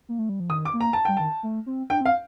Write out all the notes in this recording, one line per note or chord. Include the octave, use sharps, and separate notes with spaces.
A#3
A3
G3
F3
D#3 D#6
D6
A#3
A#5
A5
G3 G5
D#3 A5
A3
C4
D4 G5
C4
F5